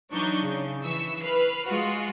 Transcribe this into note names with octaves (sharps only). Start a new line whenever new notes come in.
E3 F#3 D4 D#4 C#6 G6
C#3
E3 C#6 E6
B4 F6 C7
G#3 F4 F#4